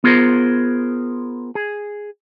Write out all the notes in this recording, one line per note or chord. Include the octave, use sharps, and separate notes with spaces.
B3 F4 G#4 A#4 C5
G#4